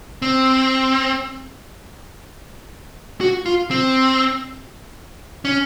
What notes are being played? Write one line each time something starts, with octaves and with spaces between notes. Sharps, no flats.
C4
F#4
F4
C4
C#4